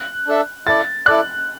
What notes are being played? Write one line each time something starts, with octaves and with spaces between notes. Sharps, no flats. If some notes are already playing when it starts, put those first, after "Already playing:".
Already playing: F#6
D4 A4 E5
E4 A4 D5 A6
E4 A4 D5 F#6